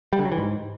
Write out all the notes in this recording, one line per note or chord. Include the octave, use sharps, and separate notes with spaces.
G3
D3
F#3
E3
G#2